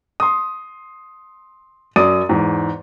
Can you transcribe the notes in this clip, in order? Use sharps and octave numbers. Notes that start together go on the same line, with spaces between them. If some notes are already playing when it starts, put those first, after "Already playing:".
C6 D#6
F#2 D5 D#6 D#7
E2 G#2